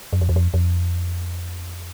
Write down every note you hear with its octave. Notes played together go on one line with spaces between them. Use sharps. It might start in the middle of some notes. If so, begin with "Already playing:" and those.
F#2
F2
E2
F2
F2